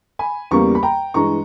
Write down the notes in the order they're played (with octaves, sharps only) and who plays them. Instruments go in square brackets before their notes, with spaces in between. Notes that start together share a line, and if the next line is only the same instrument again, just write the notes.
[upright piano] G#5 B5
E2 C#3 G3 A#3 A#5 C#6
B5
G5 A#5
G2 E3 G#3 A#5 C#6